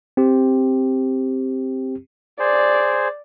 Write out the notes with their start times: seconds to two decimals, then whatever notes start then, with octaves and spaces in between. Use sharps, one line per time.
0.17 C4 G4
2.40 G#4 C5 D5